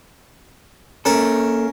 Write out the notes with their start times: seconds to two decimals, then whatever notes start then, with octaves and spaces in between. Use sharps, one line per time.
1.05 A#3 C#4 A4 A#4